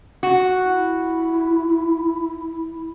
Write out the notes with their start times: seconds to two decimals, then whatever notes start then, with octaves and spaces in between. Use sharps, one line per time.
0.23 F#4
0.65 E4